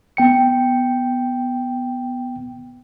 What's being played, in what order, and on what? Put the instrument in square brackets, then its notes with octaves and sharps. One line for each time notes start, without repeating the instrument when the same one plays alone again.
[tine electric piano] B3 G5 C#7